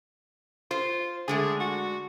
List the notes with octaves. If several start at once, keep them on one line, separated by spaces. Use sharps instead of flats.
F4 C5
D3 G#3 A3 G#4
F#4